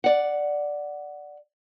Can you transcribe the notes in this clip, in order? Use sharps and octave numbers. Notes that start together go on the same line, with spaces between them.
D5 F#5